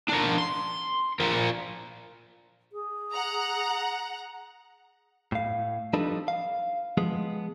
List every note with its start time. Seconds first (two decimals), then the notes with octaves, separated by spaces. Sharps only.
0.08 D4 A#4
0.38 C6
1.20 F3 A#4
2.72 G#4
3.11 F#5 A#5
5.32 A2 F5
5.93 F3 G3 D4 D#4 A4 B4
6.28 F5
6.97 F3 G#3 B3 G#4